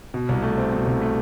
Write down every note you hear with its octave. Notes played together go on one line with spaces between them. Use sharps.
B2
C2
A3
C4
B2
C2
A3